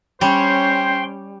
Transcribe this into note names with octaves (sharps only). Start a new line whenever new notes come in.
G3 C#4 C5 C#5 G5 C6